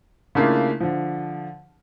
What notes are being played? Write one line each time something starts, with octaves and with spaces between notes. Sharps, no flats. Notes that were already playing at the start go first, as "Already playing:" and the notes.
C#3 A3 A#3 D4 E4 F4
D3 F3